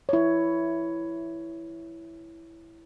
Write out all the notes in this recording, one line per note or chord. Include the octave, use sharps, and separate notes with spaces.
E4 C#5